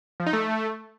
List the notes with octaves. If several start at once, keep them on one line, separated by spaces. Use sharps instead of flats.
F3
D#4
A3